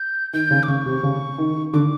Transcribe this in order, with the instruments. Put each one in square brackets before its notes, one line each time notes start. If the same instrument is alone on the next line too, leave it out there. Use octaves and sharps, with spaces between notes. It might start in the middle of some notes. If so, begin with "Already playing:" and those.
Already playing: [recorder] G6
[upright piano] D#3 [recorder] G6
[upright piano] C#3
[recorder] D6
[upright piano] C#3 [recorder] C#6
[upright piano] C3
C#3
D#3
[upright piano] D3 [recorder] D6